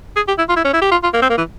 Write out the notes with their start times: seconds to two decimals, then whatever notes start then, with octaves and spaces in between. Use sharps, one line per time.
0.16 G#4
0.28 G4
0.38 E4
0.49 F4
0.56 E4
0.64 C#4
0.73 E4
0.81 G4
0.91 F4
1.03 F4
1.13 A#3
1.22 C4
1.30 A#3
1.38 E3